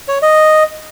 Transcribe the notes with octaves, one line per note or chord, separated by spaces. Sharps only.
C#5
D#5